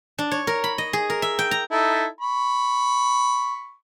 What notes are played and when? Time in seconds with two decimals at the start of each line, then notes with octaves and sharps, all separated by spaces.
0.19 D4
0.32 C#5
0.47 A#4
0.64 B5
0.78 D#5
0.93 G#4
1.10 A#4
1.22 E5
1.39 G5
1.51 A#5
1.71 D#4 E4 A4
2.21 B5 C#6